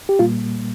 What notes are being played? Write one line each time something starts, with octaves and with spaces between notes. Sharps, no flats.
G4
A#2 G3 A#3 F4